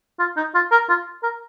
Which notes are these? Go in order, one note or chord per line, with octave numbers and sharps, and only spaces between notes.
F4
D#4
F4
A#4
F4
A#4